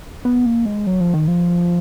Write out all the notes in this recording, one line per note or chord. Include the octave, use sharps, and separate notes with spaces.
B3
A#3
G#3
F#3
F3
D#3
F3